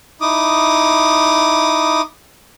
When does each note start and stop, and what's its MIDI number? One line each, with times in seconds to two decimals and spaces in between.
0.21 2.01 63
0.21 2.01 64
0.21 2.01 86
0.21 2.01 87